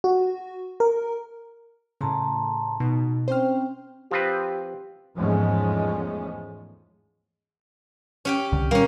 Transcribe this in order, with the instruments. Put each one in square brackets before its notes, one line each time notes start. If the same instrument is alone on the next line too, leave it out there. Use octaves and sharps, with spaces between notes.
[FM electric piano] F#4
A#4
[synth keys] A2 C#3 [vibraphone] A5 A#5 C6
[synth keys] B2 [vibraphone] D#4
[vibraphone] C4 C#4 G5 [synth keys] C5 F6
[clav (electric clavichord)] F3 C4 B4 [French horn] G4
[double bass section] E2 G#2 F3 G#3 A3 C#4
[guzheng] C#4 G4 G5
[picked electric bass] C2 D3
[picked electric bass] A#2 G3 [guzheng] A#3 C#4